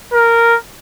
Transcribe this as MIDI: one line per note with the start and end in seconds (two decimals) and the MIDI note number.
0.13 0.55 70